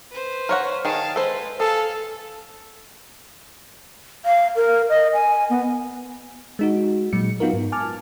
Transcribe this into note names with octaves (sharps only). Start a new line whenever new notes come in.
B4 C5
A#4 C#5 F#5
D#3 G#4 F5 A5
G#3 A4 B4 C5
G#4 A4 F5
F5
A#4
D#5
G#5
B3
G#3 D#4 F#4
A#2 F#3 G#3 C#7
B3 D#4 F4 F#4 A#4
G#2
G#5 A5 D6 F6